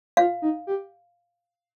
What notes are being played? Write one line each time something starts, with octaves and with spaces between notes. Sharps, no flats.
F4 F5
D#4
G4